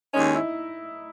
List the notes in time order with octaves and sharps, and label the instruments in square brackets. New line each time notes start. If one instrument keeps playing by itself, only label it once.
[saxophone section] D#2 D#3 G#3 C#4 [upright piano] D#4
[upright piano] E4